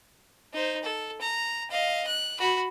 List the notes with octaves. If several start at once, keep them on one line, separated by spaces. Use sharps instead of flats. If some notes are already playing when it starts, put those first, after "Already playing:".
D#4 C5
A4
A#5
D#5 F5
F#6
F#4 B5